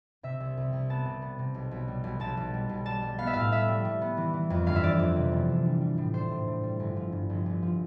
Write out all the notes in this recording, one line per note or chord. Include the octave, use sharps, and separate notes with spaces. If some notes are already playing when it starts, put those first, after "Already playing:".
C3 E5
C2
C2
C2
B3 A5
C3
B3
C3
B1
B1
G3
B1
B1 A5
B1
G3
B1
G3 A5
G3
B3 F5
E5
A2 F5
B3 E5
G3
G3
B3
E3
E3
F2
G1 F5
E5
E3 D5
F2
C3
G1
D4
G3
G3
A2
D4 C5
A2
A2
G3
G1
F3
G2
G1
G1
F3